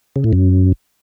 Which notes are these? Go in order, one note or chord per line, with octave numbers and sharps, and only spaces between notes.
C#3
A2
F#2